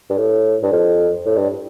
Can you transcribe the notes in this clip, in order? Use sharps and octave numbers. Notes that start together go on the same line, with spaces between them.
G2
A2
G2
F2
A2
G2